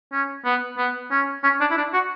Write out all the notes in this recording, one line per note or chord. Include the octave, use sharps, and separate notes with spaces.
C#4
B3
B3
C#4
C#4
D4
E4
D4
F#4